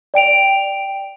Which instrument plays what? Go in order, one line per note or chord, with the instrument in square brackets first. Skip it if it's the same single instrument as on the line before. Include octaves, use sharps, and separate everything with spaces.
[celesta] D5 G5 D7 F7